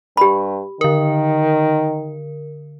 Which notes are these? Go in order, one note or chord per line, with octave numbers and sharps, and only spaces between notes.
G2 G4 B5
D3 D#3 A#4